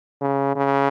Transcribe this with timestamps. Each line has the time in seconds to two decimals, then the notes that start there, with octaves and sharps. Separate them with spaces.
0.21 C#3
0.56 C#3